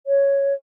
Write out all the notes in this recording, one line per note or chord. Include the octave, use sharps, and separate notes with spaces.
C#5